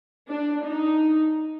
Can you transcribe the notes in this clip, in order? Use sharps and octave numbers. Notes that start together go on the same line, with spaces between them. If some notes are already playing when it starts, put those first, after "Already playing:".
D4
D#4